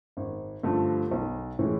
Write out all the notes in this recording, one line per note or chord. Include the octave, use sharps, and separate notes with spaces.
G#1
G2 D3 F3 A3
B1
A2 E3 G#3